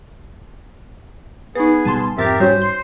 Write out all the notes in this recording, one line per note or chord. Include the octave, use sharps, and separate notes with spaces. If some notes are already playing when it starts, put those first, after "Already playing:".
B3 D#4 G#4 B4
B2 G3 G#5 A5 C6
F2 G#2 C4 G4 A#4 E5 A6
G3 C#4 F#4 C5 C#5
C6 C7